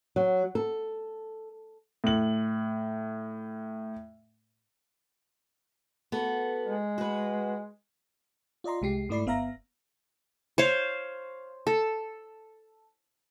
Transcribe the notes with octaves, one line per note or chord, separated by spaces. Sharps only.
F#3
A4
A2 F#7
B3 F#4 A4
G#3
F#4 B4
F4 D5 D#5 A#5 C6
C2 G#3 G4 C7
G#2 A3 E4 D5 B5 C7
G1 B3 E5 F5 A#5 A#6
C5 C#5 F5
A4